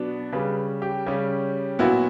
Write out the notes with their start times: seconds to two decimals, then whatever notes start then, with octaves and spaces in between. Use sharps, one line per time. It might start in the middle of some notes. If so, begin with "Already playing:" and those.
Already playing: B2 F#3 B3 D4
0.32 C#3 G3 C#4 B4
0.82 G4
1.06 C#3 G3 C#4
1.79 A#2 F#3 B3 E4 F#4